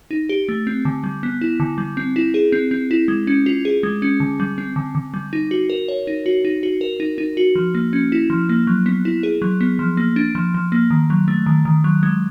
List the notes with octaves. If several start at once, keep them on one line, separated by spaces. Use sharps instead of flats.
D#4
G4
A3
C4
D3
G3
B3
E4
D3
G3
C4
E4
G#4
C4
C4
E4
G#3
C#4
F4
G#4
G#3
C#4
D3
G3
C4
D3
D3
G3
D#4
F#4
A#4
C#5
D#4
F#4
D#4
F#4
A#4
D#4
D#4
F#4
F3
A#3
C#4
E4
F3
A#3
F#3
B3
E4
G#4
F#3
B3
F3
A#3
D4
F3
F3
A#3
D#3
F#3
A3
D#3
D#3
F#3
G#3